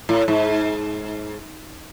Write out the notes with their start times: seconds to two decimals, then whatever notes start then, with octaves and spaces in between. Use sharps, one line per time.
0.09 A2
0.28 G#2